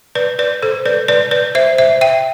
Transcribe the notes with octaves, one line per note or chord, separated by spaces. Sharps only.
B4 D5
B4 D5
A4 C5
B4 D5
B4 D5
B4 D5
C5 E5
C5 E5
E5 G5